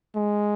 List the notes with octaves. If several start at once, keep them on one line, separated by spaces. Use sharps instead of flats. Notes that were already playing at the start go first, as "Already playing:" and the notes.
G#3